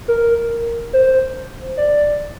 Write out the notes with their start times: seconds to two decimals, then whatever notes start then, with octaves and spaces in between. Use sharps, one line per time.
0.08 A#4
0.93 C5
1.77 D5